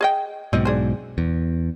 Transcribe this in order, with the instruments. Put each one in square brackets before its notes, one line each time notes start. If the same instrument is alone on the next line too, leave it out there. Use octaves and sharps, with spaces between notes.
[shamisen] G#4 D#5 G5
[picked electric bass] B1 G#2 B2 [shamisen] C4 D#5
[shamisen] D4 G#4 C5
[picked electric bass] E2